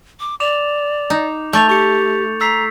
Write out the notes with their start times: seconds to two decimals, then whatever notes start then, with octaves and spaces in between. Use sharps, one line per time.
0.20 D6
0.40 D5 D6 E7 F7
1.10 D#4
1.53 A3 C#6 G6 A6 F7
1.69 G4 C#6 C#7
2.41 A#5 E6 B6 C7